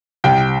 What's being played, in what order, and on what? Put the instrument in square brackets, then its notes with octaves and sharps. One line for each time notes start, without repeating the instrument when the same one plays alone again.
[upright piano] C2 G5